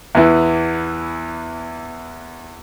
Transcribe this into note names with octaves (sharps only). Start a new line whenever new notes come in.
E2 E3